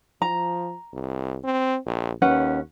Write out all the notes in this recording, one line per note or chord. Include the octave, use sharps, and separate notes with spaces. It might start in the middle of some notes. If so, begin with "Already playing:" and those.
F3 A#5
C2
C4
A#1
D#2 C#4 B4 F#5